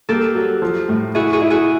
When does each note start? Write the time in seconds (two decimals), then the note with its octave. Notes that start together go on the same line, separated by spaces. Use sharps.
0.09 A#3 G4 A4
0.35 F#3
0.62 F3
0.89 A2
1.15 E4 F#4 G#4
1.33 F#4 G#4
1.42 E4
1.50 F#4 G#4